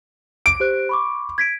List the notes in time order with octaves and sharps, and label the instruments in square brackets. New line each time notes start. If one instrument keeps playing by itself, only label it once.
[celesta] D6 [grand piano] D7
[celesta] G4 C5 F#6
B5 C#6 D6
G#6 B6 D7